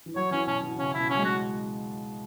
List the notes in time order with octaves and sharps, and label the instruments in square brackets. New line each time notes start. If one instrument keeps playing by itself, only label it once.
[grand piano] E3
[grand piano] F#3 [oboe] C#5
[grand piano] E3 [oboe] C#4
[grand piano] B2 [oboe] C#4
[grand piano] E3
[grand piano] C#3 [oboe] C#4
[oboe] E4
[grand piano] B2
[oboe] C#4
[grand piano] F#3
G#3
[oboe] F#4